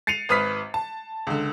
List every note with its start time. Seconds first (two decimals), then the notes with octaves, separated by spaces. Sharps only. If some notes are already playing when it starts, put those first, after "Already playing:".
0.07 A6 C7 C#7 D#7 F7
0.29 G#1 B4 D#6 F6 B6
0.74 A5
1.27 C#2 D3